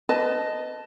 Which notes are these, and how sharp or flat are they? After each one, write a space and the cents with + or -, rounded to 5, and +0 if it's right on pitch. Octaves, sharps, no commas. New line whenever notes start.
B4 +30 D#5 +0 A5 +0